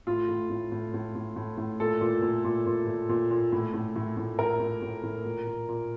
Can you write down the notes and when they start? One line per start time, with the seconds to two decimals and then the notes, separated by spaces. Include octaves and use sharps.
0.07 A2 F4
0.29 A2
0.50 A2
0.72 A2
0.94 A2
1.15 A2
1.36 A2
1.58 A2
1.80 A#2 A4
2.01 A#2
2.22 A#2
2.44 A#2
2.66 A#2
2.87 A#2
3.09 A#2
3.31 A#2
3.52 A2
3.74 A2
3.96 A2
4.17 A2
4.39 A2 A#4
4.60 A2
4.82 A2
5.03 A2
5.25 A#2
5.47 A#2
5.68 A#2